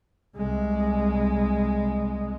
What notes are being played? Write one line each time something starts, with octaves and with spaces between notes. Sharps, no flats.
C2 G#3